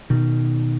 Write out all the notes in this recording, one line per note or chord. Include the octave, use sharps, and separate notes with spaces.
B2 D#3